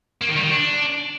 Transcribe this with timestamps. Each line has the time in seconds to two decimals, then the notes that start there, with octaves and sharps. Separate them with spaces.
0.22 A#3
0.29 D#3
0.36 G3
0.43 D#3
0.51 D4